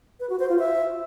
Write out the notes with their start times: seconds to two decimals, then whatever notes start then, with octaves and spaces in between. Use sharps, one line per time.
0.20 B4
0.30 F#4
0.39 C5
0.49 F4
0.59 E5